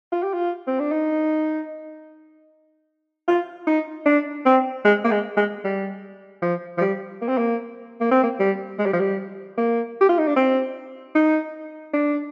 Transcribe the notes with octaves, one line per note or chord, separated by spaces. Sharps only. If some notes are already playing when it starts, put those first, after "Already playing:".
F4
G4
F4
C4
D4
D#4
F4
D#4
D4
C4
G#3
A#3
G#3
G#3
G3
F3
F3
G3
A#3
C4
A#3
A#3
C4
A#3
G3
G#3
G3
F3
G3
A#3
G4
F4
D#4
D4
C4
D#4
D4